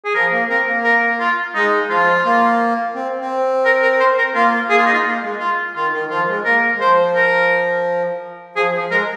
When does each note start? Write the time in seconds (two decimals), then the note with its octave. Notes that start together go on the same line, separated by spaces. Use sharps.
0.05 G#4
0.14 F3 A#4
0.32 A#3
0.49 C4 A#4
0.67 A#3
0.84 A#4
1.20 F4
1.55 G#3 D#4
1.89 F3 F4
2.24 A#3
2.95 C4
3.21 C4
3.65 A#4
3.82 A#4
4.00 C5
4.18 A#4
4.35 A#3 F4
4.70 A#3 G#4
4.78 F4
4.86 D#4
4.94 F4
5.05 A#3
5.23 G#3
5.40 F4
5.75 D#3 F4
5.93 D#3
6.10 F3 F4
6.28 G#3
6.45 A#3 A#4
6.76 G#3
6.80 F3 C5
7.15 A#4
8.56 F3 G#4
8.73 F3
8.91 G#3 A#4